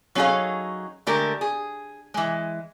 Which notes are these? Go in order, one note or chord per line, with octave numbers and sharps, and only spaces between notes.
F#3 C#4 D#4 G#4 A4 F5
D3 G#3 A3 G4 A4 A#4
G#4
E3 G#3